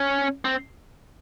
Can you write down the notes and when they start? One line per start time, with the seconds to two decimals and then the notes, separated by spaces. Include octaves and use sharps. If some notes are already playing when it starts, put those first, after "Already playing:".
Already playing: C#4
0.45 C4